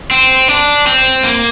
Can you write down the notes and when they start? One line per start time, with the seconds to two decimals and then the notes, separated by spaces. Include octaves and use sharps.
0.11 C4
0.48 D4
0.87 C4
1.23 A#3